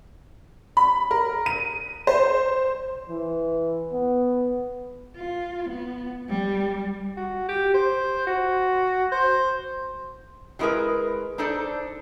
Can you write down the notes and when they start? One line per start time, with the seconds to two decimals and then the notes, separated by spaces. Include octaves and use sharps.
0.77 B5
1.11 A#4
1.46 D#7
2.07 C5
3.10 E3
3.93 B3
5.17 F4
5.69 B3
6.29 G3
7.17 F#4
7.49 G4
7.74 C5
8.27 F#4
9.12 C5
10.59 F#3 G#3 E4 G#4 A#4 B4
11.38 D4 D#4 A4 C5 D5